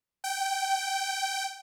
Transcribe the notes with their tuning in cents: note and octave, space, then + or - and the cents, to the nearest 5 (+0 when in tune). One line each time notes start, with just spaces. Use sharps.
G5 -15